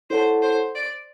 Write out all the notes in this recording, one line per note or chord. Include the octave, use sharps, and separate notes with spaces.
E4 A4 C5 C#5 F#5 A5
C5
D5